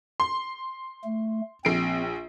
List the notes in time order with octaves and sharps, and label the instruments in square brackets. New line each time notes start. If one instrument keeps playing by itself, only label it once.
[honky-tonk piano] C6
[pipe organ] A3
[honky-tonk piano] A#1 C7 D7 [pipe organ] C4